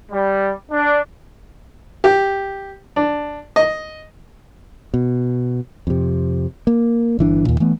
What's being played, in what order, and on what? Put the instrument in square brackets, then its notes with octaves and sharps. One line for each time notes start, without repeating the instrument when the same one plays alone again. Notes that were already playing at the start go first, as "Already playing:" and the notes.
[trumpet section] G3
D4
[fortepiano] G4
D4
D#5
[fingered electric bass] B2
F2 C3
A#3
G1 E3 D4
D#2 A#2
E3 A3 B3